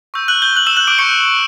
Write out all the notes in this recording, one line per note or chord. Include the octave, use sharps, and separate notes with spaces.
C#6 E6 G6
F#6 F#7
G6 G7
F#6 F#7
E6 E7
F#6 F#7
D6 D7
C#6 D6 G6 C#7